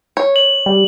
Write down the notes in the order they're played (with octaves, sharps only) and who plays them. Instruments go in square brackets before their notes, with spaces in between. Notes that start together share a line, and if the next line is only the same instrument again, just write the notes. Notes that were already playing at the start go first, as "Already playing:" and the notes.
[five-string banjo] C#5
[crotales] F#7
[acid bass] G3